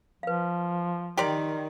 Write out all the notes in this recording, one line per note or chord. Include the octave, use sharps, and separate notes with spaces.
F3 B4 F5
D#3 G4 A#4 D5 G5 C6